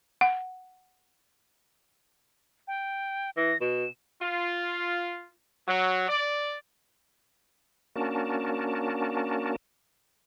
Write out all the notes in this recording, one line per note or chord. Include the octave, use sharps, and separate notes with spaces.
F#5
G5
E3 A#6
B2 E7
F4
F#3
D5
A#3 C#4 D4 F#4 A#4 A5